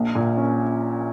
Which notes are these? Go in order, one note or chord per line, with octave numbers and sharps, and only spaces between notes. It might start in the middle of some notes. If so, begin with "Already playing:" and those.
Already playing: A#1
A#2
C#4